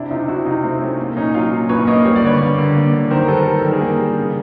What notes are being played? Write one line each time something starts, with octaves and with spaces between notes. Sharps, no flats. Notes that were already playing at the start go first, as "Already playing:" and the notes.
Already playing: C3 D4 E4
C3 D#4 F4
C3 E4 F#4
C3 D#4 F4
A3 C4
A3 C#4
A#3
A#2 C#4 D#4
F#3 D#4 F4
A#2
A#2 B4 C#5
A#3 C#5 D#5
G3 C#5
D5
D3 B4 C#5
A#3
D3
A#3
D3
D#3 A#4 C5
A#4
G3 A4 B4
G3 A#4
D#3 A4
G#4 A#4
A#3
G3
C#3